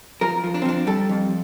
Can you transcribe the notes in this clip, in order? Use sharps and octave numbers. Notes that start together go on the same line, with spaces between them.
F3 A#4
F3
D4
C4
F3 D4
G3 A4
F2